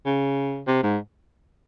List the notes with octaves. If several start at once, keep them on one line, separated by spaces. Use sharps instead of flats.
C#3
C3
G#2